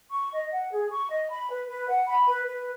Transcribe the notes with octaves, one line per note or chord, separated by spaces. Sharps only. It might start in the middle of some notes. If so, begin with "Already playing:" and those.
C#6
D#5
F#5
G#4
C#6
D#5
B5
B4
B4
F#5
B5
B4
B4